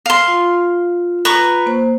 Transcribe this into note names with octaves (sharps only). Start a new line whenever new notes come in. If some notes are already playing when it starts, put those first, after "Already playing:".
F5 C6
F4
B4 A#5 C#6
A#3 C5